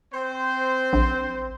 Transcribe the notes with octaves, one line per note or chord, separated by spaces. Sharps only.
C4 C5
A#1